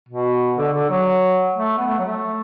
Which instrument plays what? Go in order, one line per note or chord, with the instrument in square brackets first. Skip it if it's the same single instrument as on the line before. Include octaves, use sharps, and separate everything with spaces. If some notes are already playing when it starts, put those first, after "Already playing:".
[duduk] B2
D3
D3
F#3
A3
B3
A3
F#3
A3